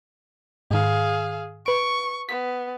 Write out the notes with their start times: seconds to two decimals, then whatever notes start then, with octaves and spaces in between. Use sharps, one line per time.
0.71 G#2 D#3 G#4 F5
1.66 B4 C#6 D7
2.29 B3 B6